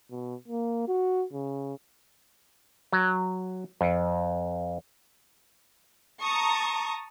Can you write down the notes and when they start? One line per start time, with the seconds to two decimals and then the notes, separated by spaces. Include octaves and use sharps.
0.11 B2
0.48 A#3
0.88 F#4
1.33 C#3
2.93 F#3
3.81 F2
6.23 A5 A#5 C#6 D#6